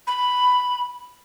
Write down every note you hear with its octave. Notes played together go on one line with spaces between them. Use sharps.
B5